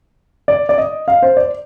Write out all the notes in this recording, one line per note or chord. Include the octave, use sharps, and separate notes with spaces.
D5
D5
D#5
F5
C5
D5